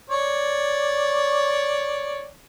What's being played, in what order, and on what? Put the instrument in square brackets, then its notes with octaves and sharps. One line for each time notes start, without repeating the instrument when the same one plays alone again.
[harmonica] C#5 D5